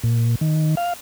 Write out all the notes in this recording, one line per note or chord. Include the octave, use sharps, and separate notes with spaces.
A#2
D#3
F5